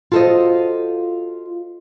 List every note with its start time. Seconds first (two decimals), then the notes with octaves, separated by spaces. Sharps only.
0.12 F4 F#4 A4 A#4 C5 D#5